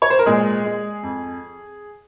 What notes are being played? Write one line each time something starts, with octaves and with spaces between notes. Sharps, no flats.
C#5
C5
A#4
A#2 G#3 G#4
G#3
F2